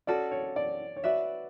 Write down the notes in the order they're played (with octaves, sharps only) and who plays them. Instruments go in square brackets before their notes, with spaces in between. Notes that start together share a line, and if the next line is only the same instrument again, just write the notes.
[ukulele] C#4 F#4 A4 [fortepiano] D5
[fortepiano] C#5
D5
C#5
[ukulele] F#4 B4 E5 [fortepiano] D5